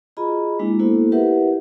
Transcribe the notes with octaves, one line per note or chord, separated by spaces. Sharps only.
F4 F#4 G#4 D#5 A#5 B5
G#3 A#3 D4 E4 F#4
A#3 B3 E4 F#4 A4 C5
E4 G4 A#4 B4 E5 F#5